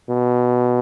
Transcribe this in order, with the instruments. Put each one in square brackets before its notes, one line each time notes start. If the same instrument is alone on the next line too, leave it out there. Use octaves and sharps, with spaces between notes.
[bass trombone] B2